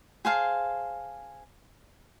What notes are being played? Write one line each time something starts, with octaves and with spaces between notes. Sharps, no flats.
G#4 C5 F5 A5